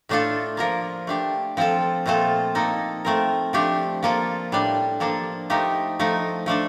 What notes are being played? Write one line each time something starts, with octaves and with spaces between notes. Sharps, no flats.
A2 A3 D4 F4 A4
F3 A#3 F4 A#4
A3 D4 G4
F3 C4 F4 A4
A#2 A3 C4 F4 A4
F3 A#3 D#4 A4
A3 C4 F4 A#4
F3 A3 D4 G4
F3 A#3 F4 A4
A2 G3 D4
F3 A#3 D4 A4
F3 A3 D#4 G4
F3 A3 D#4
F3 A3 D4 A4